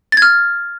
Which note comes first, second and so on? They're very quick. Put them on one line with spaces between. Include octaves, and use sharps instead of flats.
A6 G#6 F6